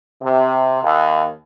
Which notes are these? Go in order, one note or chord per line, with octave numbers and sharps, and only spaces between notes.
C3
D#2